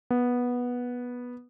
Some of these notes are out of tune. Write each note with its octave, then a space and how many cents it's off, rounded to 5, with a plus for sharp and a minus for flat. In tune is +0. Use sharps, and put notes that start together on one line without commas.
B3 -10